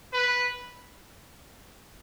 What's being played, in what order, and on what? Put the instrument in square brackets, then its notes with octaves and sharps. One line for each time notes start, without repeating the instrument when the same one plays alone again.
[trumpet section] B4